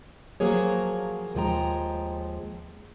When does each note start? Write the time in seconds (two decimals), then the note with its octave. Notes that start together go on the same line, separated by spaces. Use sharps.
0.40 F3 F#3 A#3 G#4 C#5
1.35 D#2 F3 G#3 G5 A#5